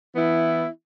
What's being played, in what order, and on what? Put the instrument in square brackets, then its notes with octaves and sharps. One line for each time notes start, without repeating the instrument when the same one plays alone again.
[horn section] E3 B3 E4